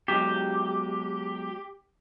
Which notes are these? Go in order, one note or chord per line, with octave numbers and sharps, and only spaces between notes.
B2 F#3 G#3 G4